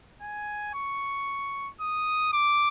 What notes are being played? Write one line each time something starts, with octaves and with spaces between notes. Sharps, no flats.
G#5
C#6
D#6
D6